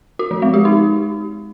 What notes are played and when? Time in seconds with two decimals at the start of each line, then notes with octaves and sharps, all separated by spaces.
0.19 F#4
0.31 F3
0.42 G#3
0.54 G4
0.65 D#4